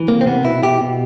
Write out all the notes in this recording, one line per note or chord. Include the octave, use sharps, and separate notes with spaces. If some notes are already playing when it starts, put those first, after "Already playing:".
Already playing: E3
C3 A#3
C4
C3 B3
B2 E4
B2 G4
B2